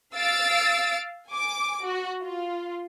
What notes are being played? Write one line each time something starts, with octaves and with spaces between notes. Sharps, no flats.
F5 E6 A6 D7
G#5 D6
F#4
F4